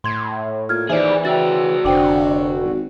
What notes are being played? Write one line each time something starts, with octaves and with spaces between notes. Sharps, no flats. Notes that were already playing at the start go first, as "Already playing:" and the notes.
A2 C6 G#6
A#2 F6 G#6
D#2 E3 G#4 C5 D5 E5
C#3 F#4 D5 G5 E6 A6
F1 D3 C5 G5 D6
G#1